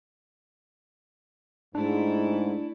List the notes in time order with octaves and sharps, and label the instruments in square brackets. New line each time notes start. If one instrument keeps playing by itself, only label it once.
[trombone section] G#2 [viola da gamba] A3 E4 [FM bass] D4